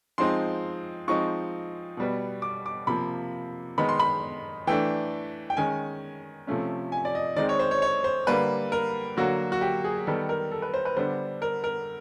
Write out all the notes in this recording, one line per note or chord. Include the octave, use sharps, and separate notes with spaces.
F3 G#3 C4 D#4 C6
F3 G#3 C4 D#4 C#6
B2 G3 B3
D6
D6
C3 F3 A#3 B5
D#3 G#3 B3 D#4 B5
C6
B5
E3 A3 D4 G5
G5
D#3 G#3 C#4 G#5
C3 F3 A3 C#4
G#5
D5
D#5
D#3 G#3 C4 D#4 D5
C#5
C5
C#5
C#5
C5
D3 G3 A#3 B4
A#4
D3 F#3 A#3 F#4
F#4
G4
G#4
D#3 G3 B3 A4
A#4
A4
B4
C5
B4
D3 G3 B3 D4 C5
A#4
A#4